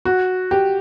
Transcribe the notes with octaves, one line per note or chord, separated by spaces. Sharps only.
F#4
G4